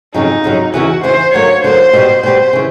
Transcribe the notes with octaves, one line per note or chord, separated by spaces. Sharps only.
F2 C#3 F#3 D#4
F2 C#3 F#3
E2 C#3 E3 F#4
E2 C#3 E3 C5
D3 F#3 A#3 C#5
D3 F#3 A#3 C5
B2 G3 B3
B2 G3 B3 C5
C#3 E3